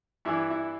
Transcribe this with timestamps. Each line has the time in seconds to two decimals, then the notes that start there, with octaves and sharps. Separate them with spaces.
0.25 G2 E3 E4
0.50 E4